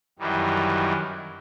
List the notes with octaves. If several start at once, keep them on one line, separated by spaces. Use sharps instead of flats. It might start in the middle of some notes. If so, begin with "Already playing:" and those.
F#2 D#3 E3 G3